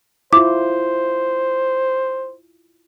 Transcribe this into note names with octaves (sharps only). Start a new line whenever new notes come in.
E4 F4 C5 D6